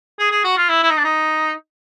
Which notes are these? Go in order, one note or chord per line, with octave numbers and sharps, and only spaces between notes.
G#4
G#4
F#4
F4
E4
E4
D#4
D4
D#4